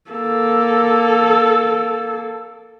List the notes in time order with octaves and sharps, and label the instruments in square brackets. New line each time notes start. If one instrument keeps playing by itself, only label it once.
[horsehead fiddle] A#3 A4